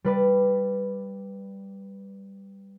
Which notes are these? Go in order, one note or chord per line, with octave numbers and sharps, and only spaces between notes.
G3 B4 D5